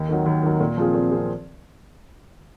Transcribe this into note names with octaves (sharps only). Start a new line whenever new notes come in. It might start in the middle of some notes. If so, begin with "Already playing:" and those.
Already playing: D#2
D#3 F#3
D#2
D#3 F#3
A#2
F3 C4 F4 G#4
A#2
F3 C4 F4 G#4